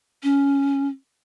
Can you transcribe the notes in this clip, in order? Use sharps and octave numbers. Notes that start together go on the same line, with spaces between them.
C#4